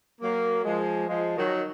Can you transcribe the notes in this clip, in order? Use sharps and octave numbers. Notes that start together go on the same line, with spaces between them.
F#3 A#3
F3 G#3
F3 G#3
D#3 F#3